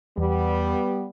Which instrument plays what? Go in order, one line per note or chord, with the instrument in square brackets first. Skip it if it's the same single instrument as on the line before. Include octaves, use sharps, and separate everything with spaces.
[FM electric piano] E2 [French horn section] G3 B3